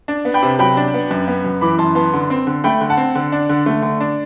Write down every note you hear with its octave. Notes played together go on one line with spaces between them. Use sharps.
D4
B3
G5 B5
C3
F#3 G5 B5
D4
B3
F#2
B3
F#2
E3 B5 D6
F#2 A5 C6
B3 A5 C6
D3
C4
D3
A3 G5 B5
D3
F#5 A5
C4
D3
D4
D3
A3
D3
D4